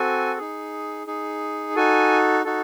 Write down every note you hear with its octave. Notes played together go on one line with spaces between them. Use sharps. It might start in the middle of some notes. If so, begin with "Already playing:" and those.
Already playing: C4 F#4 A4 G#5
D#4 G#4
D#4 G#4
D#4 F#4 A4 G#5
D#4 F#4 A4